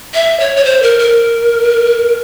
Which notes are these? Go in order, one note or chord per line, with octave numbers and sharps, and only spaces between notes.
E5
C#5
C#5
C5
A#4
A#4